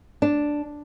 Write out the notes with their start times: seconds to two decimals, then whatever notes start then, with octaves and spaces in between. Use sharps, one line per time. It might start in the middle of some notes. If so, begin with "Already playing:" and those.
0.22 D4